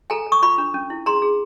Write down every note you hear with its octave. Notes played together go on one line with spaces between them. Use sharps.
A4 G#5 A#5
A4
C#6 D#6
F4 B5 C#6
D4
C#4
E4
G#4 A#5 C6
G#4